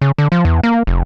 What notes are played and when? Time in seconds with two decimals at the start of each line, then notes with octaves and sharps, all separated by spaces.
0.02 C#3
0.18 D3
0.32 F3
0.45 E2
0.63 A#3
0.87 F1